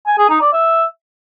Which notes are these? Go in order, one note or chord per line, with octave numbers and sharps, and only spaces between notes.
G#5
G#4
D#4
D5
E5